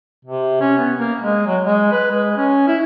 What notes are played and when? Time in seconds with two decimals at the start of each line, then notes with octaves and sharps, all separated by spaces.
0.25 C3
0.61 C#4
0.78 B3
0.97 A#3
1.20 G#3
1.46 F#3
1.64 G#3
1.92 B4
2.10 G#3
2.37 C#4
2.67 E4